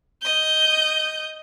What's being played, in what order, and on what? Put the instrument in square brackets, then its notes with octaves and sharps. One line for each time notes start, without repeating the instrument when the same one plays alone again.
[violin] D#5 G6